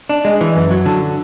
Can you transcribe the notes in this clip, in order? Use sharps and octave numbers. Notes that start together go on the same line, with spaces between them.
D4
G#3
E3
F#2
F#3
D3